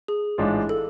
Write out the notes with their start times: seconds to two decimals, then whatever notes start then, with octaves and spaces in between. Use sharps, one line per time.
0.08 G#4
0.38 A1 G#2 G#3 D4 F4
0.69 A4